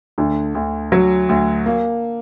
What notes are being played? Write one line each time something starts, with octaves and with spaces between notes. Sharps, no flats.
D2 D3
D2
F#3
D2
A#3